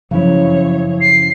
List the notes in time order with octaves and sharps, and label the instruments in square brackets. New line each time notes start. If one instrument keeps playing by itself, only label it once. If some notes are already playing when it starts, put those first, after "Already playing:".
[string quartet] F#2 C#5 [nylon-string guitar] C#3 E4 [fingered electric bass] F3 F#3
[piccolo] C7